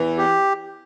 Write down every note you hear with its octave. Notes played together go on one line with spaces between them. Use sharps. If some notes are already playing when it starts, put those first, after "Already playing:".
Already playing: E2 E3
G4